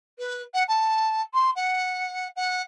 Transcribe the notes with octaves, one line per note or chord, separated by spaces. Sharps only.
B4
F#5
A5
C6
F#5
F#5